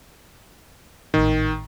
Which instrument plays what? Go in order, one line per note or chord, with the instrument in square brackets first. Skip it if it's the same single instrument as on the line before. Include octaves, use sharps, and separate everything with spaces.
[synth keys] G#1 A2 [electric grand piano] D#3